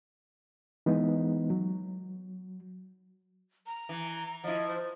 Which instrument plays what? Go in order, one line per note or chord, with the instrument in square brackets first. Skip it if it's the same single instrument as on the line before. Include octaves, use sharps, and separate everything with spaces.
[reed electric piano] E3 G#3 B3 D#4
F#3
[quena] A#5
[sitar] E3
[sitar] F3 E4 [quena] D#5
[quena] C5